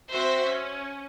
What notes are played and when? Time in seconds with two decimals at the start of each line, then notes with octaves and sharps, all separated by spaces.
0.12 C4 F#4 C5 E5
0.47 C#4